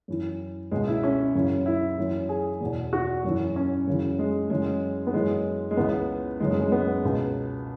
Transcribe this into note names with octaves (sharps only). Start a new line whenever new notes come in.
F#2 E3
C#2 B2 G#3
E4
C#4
F#2 C#3 E3
E4
F#2 E3
G#4
E2 B2
F#4
F#2 E3
C#4
F#2 C#3 E3
G#3
F#2 C#3 E3 G#3
B3
F#2 E3 G#3
G#3
C#2 C#3 E3 B3
F#2 C#3 E3 G#3
G#3
G#3
B3
C#2 B2